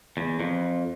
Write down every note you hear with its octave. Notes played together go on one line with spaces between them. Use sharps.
E2
F2